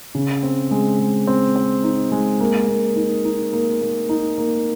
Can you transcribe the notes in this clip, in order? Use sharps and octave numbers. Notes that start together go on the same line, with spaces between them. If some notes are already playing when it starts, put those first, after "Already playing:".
C#3
C4
G#3
G#3
C4
C4
D#4
G#3
A#3
A#3
D#4
D#4
A#3
A#3
D#4
A#3